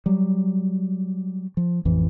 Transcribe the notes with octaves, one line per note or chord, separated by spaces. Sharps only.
F#3 G3
F3
A1 F2 E3